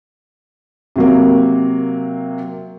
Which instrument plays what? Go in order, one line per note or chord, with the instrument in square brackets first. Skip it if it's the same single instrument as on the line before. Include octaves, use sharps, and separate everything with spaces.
[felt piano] C3 F#3 A#3